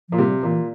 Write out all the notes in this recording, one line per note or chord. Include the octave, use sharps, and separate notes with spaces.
A#2 F3
C3 G3
A#2 E3